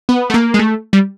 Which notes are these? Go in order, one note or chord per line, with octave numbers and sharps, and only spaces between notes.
B3
A3
A#3
G#3
A3
G3